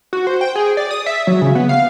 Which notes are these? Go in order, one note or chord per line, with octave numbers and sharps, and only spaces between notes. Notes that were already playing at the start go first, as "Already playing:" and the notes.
F#4
C5
G5
G#4
D5
D#6
E5
F#3
C#3
B3
F5